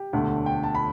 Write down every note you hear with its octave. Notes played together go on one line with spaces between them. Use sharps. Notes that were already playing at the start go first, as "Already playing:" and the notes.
Already playing: G4
E1 D2 D3 A3
G5
A5
B5